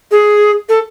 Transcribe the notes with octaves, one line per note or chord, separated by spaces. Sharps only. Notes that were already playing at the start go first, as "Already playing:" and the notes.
G#4
A4